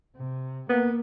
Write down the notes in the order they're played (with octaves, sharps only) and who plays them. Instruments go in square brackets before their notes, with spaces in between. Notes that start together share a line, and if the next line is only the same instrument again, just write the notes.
[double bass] C3
[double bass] A#3 [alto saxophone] B3